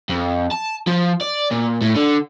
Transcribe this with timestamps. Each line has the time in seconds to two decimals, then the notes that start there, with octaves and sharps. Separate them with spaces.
0.09 F2
0.51 A5
0.87 F3
1.21 D5
1.51 A#2
1.82 A2
1.96 D3